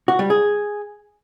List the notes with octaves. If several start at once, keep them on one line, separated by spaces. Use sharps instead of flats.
F#4
G3
G#4